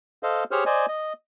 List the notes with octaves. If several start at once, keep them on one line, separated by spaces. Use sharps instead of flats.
A4 C5 D#5 F5
G4 G#4 C5 C#5 F6
C5 D5 D#5 G#5
D#5